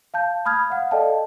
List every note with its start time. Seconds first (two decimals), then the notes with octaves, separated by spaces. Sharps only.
0.14 F5 A5 G6
0.46 B5 D#6 F6 G#6
0.70 F5 F#5
0.91 A4 D5 D#5 F5 G5 A5